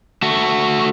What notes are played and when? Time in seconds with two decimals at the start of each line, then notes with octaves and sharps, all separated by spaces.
0.22 A3 F#4